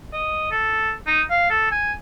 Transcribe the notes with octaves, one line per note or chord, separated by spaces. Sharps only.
D#5
A4
D#4
F5
A4
G#5